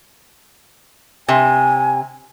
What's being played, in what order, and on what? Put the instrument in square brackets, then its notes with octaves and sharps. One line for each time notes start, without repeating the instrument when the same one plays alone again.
[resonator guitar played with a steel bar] C3 [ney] G#5